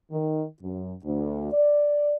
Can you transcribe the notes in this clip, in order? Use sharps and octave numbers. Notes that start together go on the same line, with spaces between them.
D#3
F#2
D2
D5